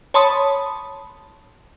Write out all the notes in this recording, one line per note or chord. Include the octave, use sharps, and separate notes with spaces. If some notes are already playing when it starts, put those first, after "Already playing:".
C#5 A5 B5 C6 D#6